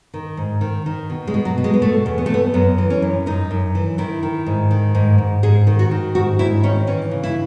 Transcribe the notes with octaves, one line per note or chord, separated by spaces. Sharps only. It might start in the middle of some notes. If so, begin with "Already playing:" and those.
D#3
G#2
D#3
D#3
B2
G#3
B2
F#3
B2
G#3
B3
B2 A3
E2
B3
A3
E2 B3
F#2 B3
E3
C#4
F#2
F#2 D#4
F#2
E3
D#3 E4
D#3
G#2
D#3
G#2
G#2
G#2 G#4
D#3
F#4
D#3
G#2 F#4
G#2 E4
D#3 C#4
E3 C#4
C#3
E4